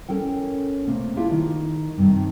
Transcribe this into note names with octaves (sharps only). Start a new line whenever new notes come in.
C#4 A4 A#4 G5
C3 A3 A#3
D4 E4 F4 G4 G#4
D#3
G2 C3 D#3